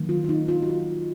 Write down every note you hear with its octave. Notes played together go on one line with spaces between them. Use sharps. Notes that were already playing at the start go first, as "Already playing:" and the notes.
Already playing: D#3 F#3 A#3
F4
F4
D#4
F4
F#4
F4